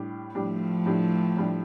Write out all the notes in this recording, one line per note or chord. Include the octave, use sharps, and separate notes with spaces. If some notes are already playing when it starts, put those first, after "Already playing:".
Already playing: A2 G3 D4 G4
A2 F3 G3 A3 D4 G4
A2 G3 D4 G4
A2 G3 D4 G4